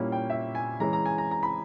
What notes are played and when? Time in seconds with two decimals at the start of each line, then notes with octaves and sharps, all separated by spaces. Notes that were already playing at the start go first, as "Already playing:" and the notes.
Already playing: A#2 G3 A#3 C#4 E4
0.12 G5
0.30 E5
0.55 G#5
0.80 E3 G#3 C#4 A#5
0.93 A#5
1.06 G#5
1.18 A#5
1.31 A#5
1.43 B5